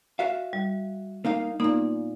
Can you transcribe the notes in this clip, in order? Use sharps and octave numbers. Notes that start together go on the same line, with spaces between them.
F#4 E5 F5
G3
A#3 D#4 F5
A#2 A#3 B3 D#4